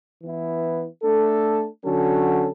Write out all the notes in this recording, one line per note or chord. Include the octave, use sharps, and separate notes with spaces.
E3 B3 E4
A3 D4 A4
D3 F#3 C#4 F#4 A4